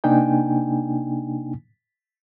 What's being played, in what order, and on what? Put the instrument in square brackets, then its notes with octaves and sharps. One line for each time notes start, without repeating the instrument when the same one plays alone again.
[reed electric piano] C3 A#3 D4 D#4 G5 G#5